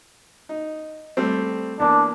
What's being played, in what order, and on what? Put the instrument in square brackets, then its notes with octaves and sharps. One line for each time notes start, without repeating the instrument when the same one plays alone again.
[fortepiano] D#4
G3 A3 C4
[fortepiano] E2 A#3 [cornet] D4